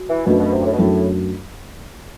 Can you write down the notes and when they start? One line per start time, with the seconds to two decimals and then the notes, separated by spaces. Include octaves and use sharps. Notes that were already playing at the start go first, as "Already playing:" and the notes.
Already playing: F#4
0.09 E3
0.26 F#2 B2 F#3 A3 D4 F#4
0.39 B2
0.52 C3
0.60 G2
0.65 A2
0.73 B2
0.78 F#2 A2 F#3 A3 D4 F#4